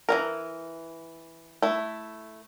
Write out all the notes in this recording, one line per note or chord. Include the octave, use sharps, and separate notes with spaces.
E3 A#3 A#4
A3 E4